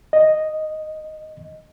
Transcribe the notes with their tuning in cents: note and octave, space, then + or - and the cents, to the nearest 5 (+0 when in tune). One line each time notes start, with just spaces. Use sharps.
D#5 -5